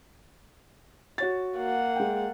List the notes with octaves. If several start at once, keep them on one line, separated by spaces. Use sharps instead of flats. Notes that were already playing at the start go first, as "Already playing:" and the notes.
F#4 C#5 A6
A#3 F#5
G#3 G5